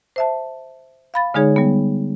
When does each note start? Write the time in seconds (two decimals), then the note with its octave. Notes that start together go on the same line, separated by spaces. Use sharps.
0.16 C5 E5 A5
1.14 F5 B5 A6
1.34 D3 G#3 D#4 G#4 C#5
1.56 G3 B3